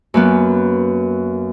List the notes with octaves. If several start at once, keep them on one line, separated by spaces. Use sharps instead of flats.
F#2 A#3 B3